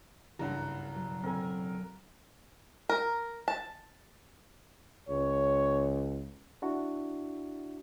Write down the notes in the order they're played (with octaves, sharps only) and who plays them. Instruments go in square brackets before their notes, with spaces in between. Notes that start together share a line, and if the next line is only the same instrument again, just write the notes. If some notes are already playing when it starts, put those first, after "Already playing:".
[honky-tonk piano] F#1 G2 [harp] C2 A#2 [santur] F#5 A#5
[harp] B2 F#3
[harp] D3 F#4 [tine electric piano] C4 A4 [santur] A#4 G#5
[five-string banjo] A#4
A5
[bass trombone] C#2 [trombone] C#5
[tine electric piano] D4 E4 F#4